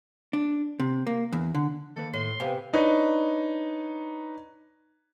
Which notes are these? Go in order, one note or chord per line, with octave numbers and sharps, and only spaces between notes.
D4
C3
A#3
E2
D3
D#3 A#3 A4 B4
A2 C6
C3 B3 C5 F5 G#5
D4 D#4 B4 C#5 D#5